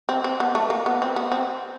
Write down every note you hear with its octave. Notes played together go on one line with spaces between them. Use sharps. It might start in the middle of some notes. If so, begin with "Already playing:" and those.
C4
C4
B3
A3
A#3
B3
C4
B3
C4